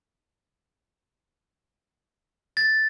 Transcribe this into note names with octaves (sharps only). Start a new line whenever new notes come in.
A6